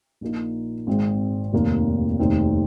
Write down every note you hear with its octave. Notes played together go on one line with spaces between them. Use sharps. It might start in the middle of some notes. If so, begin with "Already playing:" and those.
A#1 A#2 A#3 D#4
G#1 G#2 G#3 C4
F1 D#2 D#3 A#3
F1 D#2 D#3 C4